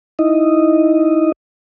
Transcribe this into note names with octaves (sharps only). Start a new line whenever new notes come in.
D#4 E4 D#5